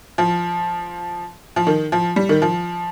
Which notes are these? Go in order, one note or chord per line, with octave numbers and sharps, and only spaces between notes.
F3
F3
D#3
F3
G3
D#3
F3